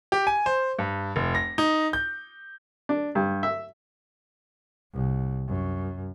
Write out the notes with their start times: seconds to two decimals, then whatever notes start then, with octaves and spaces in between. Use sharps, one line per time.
0.12 G4
0.27 G#5
0.46 C5
0.79 G2
1.16 F1
1.35 A#6
1.58 D#4
1.93 G6
2.89 D4
3.15 G2
3.43 E5
4.93 C2
5.48 F#2